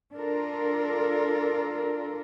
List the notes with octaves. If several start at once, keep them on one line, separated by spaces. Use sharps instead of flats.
D4 F4 A4 A#4